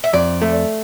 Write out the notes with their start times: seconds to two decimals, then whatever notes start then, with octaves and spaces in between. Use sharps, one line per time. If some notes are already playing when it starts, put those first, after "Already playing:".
0.04 E5
0.13 F2 D5
0.42 A3